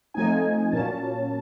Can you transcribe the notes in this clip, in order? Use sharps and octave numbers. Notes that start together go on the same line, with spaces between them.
F3 A3 C4 D#4 G#5
A#2 F#3 A#3 C#4 A5